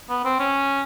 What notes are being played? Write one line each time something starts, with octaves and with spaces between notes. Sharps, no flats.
B3
C4
C#4